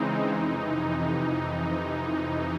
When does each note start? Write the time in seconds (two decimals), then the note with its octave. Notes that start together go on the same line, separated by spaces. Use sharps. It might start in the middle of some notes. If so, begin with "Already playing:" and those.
Already playing: C#3 E3 G#3 C4 D#4
0.29 F2 C3 E3 D#4